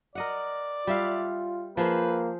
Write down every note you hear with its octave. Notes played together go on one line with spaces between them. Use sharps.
A#4 D5 D#5 F#5
G3 F4 E5 F5
F3 A#3 G#4 B4 C5